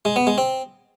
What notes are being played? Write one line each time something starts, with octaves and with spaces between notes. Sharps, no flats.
G#3
B3
G#3
C4